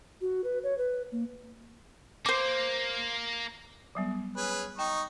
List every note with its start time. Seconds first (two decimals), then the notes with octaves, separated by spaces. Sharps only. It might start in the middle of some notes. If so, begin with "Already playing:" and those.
0.21 F#4
0.44 B4
0.63 C#5
0.78 B4
1.12 A#3
2.26 A#3 C5 D6
3.95 F#3 G3 B3
4.37 C#4 G#4 B4
4.79 D#4 G5 C#6